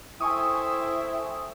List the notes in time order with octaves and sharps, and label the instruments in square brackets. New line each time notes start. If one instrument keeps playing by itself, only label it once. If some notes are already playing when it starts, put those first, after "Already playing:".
[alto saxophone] E4 [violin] A4 C5 [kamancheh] E5 G5 [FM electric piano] G#5 C#6 D#6